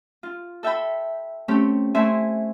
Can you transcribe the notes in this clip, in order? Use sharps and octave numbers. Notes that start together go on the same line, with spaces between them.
F4
A4 E5 G5 B5
A3 C4 C#4 G4
A3 E4 C5 E5 G#5